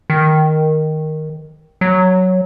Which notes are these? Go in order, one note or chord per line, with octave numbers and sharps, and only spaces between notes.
D#3
F#3